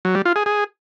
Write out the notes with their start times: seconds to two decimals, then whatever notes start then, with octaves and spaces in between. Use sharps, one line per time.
0.05 F#3
0.15 G3
0.25 F4
0.36 G#4
0.46 G#4